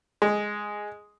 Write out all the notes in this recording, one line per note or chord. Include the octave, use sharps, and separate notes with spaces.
G#3